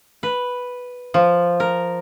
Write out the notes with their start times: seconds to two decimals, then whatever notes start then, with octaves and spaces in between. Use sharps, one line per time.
0.23 B4
1.14 F3
1.60 A#4